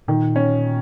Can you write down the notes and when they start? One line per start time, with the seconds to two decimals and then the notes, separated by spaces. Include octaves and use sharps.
0.08 A#2 D#3
0.36 C#4